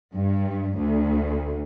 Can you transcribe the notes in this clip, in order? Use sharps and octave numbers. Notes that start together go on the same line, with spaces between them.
G2
D2